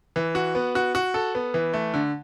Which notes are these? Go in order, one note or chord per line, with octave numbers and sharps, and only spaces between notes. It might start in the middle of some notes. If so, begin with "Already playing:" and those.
E3
F#4
B3
F#4
F#4
A4
B3
E3
A3
D3